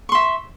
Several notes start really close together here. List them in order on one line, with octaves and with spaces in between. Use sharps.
C#6 C6 E5